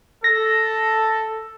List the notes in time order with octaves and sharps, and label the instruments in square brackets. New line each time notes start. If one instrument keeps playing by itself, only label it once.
[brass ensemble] A4 [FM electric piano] A#6